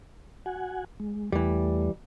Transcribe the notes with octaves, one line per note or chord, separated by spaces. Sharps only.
F#4 F#5 G#5
G#3
E2 E3 G3 A3